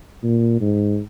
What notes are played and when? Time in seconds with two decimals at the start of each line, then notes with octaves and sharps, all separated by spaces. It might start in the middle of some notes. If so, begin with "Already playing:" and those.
0.23 A#2
0.61 G#2